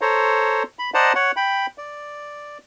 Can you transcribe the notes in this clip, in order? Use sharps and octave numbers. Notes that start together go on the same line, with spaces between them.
A4 C5 C#5 A#5
B5
C5 D5 D#5 F#5 A5 A#5
C#5 F#5
G5 B5
D5